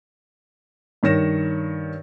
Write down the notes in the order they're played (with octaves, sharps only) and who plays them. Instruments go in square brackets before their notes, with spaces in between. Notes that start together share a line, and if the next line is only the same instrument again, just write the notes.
[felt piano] G2 D#3 C#5 A#6 E7